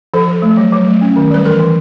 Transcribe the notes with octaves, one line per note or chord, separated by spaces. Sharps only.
F3 A4
F3
A3
F#3
F#3
A3
C#4
D#3
G3 B4
E3 A#4
E3